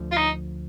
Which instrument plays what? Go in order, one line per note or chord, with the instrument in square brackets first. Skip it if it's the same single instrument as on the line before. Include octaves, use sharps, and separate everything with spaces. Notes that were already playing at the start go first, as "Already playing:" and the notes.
Already playing: [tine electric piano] D2 D3 F3
[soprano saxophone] F4
D#4